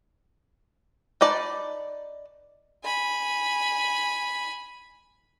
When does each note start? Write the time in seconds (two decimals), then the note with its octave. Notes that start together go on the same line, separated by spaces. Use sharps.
1.21 D#4 B4 D5 A5
2.84 G#5 B5